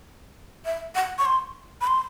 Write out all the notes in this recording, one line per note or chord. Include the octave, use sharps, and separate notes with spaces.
E5
F#5
C#6
C6
B5
C6